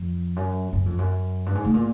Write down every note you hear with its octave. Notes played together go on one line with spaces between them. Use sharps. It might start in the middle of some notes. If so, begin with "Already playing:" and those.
Already playing: F2
F#2
F#2
F2
F#2
G2
G#2
A2
A#2